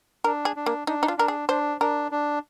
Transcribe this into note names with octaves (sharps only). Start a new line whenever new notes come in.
D4 A#4
G#4
D4
A#3
D4 D#4
D#4
F4
D4 A#4
G#4
D4 C5
D4 A#4
D4